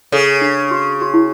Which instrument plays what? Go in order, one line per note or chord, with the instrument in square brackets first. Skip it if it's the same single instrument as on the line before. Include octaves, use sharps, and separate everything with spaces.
[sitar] C#3 [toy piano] A4
[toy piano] D4
F#4
F#4
E4